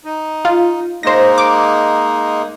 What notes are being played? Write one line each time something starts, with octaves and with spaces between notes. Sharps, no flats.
D#4
F4
G#3 A#3 D#4 C5 A#6
D6